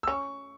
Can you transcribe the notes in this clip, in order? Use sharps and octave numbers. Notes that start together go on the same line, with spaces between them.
E6
C#4 C#6